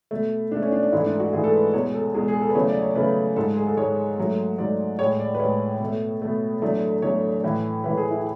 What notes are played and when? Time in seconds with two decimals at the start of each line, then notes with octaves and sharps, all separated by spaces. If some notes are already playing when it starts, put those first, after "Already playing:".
0.11 B2 A3
0.51 B2 A3 D4
0.62 C#4
0.72 D4
0.83 D4
0.92 G#2 E3 A3 E4
1.06 D4
1.20 F#4
1.33 G#2 E3 A3 G#4
1.44 A4
1.53 B4
1.74 E2 B2 G#3 C#5
1.94 A4
2.14 E2 B2 G#3 G#4
2.28 G#4
2.41 A4
2.49 B4
2.55 E2 C#3 F#3 A3 C#5
2.69 D5
2.82 C#5
2.95 E2 C#3 F#3 A3 B4
3.36 G#2 G#3 A4
3.57 G#4
3.67 A4
3.77 G#2 G#3 C#5
4.18 G#2 F#3 A3
4.58 G#2 F#3 A3 D5
4.99 A2 G#3 C#5
5.20 D5
5.35 B4
5.39 A2 G#3 C#5
5.80 B2 A3
6.22 B2 A3
6.62 E2 D3 F#3 A3
7.02 E2 D3 F#3 A3 C#5
7.44 A2 E3 A3
7.84 A2 E3 A3 B4
7.97 G#4
8.11 E4